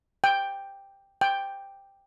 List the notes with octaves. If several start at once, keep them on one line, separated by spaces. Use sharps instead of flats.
G5
G5